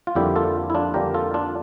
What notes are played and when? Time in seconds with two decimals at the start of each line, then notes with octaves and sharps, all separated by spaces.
0.07 F4
0.15 F2 D3 G3 A#3 E4 G4
0.36 F4 A4
0.70 E4
0.75 D4 F4
0.94 F2 D3 G3 A#3 G4 A#4
1.14 F4 A4
1.34 D4 F4